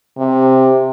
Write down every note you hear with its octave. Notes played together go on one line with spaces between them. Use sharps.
C3